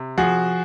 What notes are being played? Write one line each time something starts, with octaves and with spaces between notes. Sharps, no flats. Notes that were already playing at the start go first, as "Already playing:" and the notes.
Already playing: C3
F3 F#4 G#4